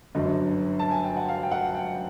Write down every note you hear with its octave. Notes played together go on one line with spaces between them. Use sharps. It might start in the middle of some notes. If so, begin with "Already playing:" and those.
G1 F#2 D3 D#5
A5
G#5
G5
F#5
F5
G5
F#5
G5